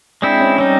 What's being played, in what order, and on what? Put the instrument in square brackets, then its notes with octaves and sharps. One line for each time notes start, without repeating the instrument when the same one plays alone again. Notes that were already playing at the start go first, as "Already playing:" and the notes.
[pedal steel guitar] G#3 C4 E4 [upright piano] D4
[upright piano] C#4
[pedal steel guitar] G3 C4 D#4 [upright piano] C#4